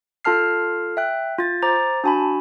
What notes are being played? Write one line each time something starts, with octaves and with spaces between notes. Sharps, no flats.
F4 A4 A5 F6 C7
E5 G5 F#6
F4 A6
C5 A#5 D6 A6
D4 F#4 G#5 A5 B5